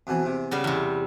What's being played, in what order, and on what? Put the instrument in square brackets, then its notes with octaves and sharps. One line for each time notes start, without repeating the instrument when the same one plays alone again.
[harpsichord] F2 B2 E3
E2 C3
[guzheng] C#3 G3 F5 [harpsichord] B3
[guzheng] E2 C3